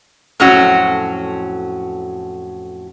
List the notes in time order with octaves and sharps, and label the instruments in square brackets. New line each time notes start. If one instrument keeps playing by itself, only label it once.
[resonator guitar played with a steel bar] F2 A2 F#3 C#4 F#4